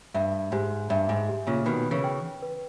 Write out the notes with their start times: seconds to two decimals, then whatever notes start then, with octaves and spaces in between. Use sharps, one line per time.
0.14 G2 E5
0.52 G#2 G4
0.90 G2 E5
1.09 G#2
1.29 G4
1.47 A#2 C#3
1.66 B2 D#3 B4
1.91 C#3 E3
2.04 G5
2.42 B4